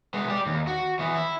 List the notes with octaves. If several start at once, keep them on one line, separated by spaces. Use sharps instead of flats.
G#3 B3
G4 D5
D#2
F#4
E3 B3
E4